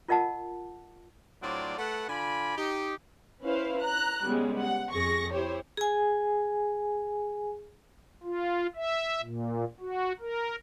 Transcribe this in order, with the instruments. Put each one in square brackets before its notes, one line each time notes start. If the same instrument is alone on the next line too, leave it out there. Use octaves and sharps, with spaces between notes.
[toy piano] F4 A#4 D#5 F#5 A5
[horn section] A2 F#3 C4 D4 F4 D5
A3 A4 B4 F#5
D3 F4 D5 G#5 B5
D#4 G4
[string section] C#4 E4 B4 C5 F5
A#5 F#6
C#3 G3 G#3 B3
F#5
F2 C4 G#4 C#6 A#6
E4 G4 C5 C#5
[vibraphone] G#4 G#5
[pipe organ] F4
E5
A#2
F#4
A#4